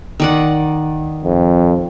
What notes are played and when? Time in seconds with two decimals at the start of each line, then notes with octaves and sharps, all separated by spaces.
0.20 D#3 D5 F#5
1.24 F2